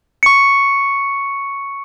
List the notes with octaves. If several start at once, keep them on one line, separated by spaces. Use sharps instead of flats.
C#6 C#7